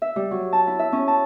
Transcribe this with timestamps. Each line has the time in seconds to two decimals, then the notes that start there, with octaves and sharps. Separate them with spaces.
0.02 E5
0.16 G3
0.31 F#3
0.53 A5
0.67 E4
0.79 E5
0.92 C#4
1.08 A5